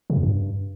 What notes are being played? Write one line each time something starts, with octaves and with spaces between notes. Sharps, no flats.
C#3
F2
G2